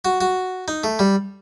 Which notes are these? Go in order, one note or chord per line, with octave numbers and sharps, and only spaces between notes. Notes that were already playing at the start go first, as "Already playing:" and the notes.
F#4
F#4
D#4
A3
G3